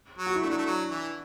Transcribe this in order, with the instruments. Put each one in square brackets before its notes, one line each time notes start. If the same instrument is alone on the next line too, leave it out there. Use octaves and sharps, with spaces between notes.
[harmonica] F#3
[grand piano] F#4
E4
[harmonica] A3 [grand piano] D4 F#4
[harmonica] F#3
A3
F#3
E3